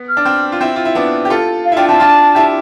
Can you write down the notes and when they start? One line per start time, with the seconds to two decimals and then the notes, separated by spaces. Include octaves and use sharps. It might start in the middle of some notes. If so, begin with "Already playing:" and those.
Already playing: B3
0.09 F6
0.17 D4
0.25 C4
0.52 F4
0.61 C4 E4
0.76 F4
0.85 E4
0.95 B3 D4
1.25 G4
1.30 F4 A4
1.65 F5
1.72 E4
1.77 D4 F4 G5
1.89 C4 E4 A5
2.00 D4 F4
2.35 E4 G4